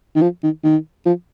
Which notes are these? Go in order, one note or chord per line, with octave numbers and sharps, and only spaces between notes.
D#3
F3
D#3
D#3
F3